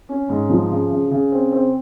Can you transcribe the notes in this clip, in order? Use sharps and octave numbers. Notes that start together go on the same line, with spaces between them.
C#4
G#2
F3
C#3
C#3
C#3
C4
C4